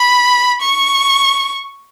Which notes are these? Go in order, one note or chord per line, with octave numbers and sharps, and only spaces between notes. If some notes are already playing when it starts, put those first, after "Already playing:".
Already playing: B5
C#6